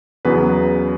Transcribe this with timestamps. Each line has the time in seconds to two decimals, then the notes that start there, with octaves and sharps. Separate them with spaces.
0.25 E2 C#3 F#3 B3 B4